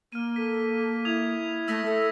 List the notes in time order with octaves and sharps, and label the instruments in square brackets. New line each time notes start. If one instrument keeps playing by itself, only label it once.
[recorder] A#3 [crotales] F6 D#7
[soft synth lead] A4 [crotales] B6
[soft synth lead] E4 [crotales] D#6 G#6 F7
[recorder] A3 [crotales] E6 A#6 B6
[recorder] A4